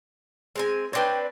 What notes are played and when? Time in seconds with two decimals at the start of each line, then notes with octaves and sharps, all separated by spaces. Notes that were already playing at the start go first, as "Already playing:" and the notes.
0.56 G#3 C4 G#5
0.93 C4 D4 B4 C#5 G5